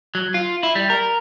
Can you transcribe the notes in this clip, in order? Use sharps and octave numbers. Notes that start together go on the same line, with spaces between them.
F#3
F4
E4
G3
A#4